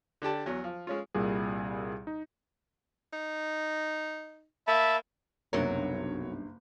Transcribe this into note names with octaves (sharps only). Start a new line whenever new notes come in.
D3 D4 G4 A5
E2 F#3
F3
G#3 C#4 F4
C2 A#2 G3 G#4
D#4
D#4
A#3 E5 A5 B5
F#1 B1 G2 C3 F#3 A#4 C#5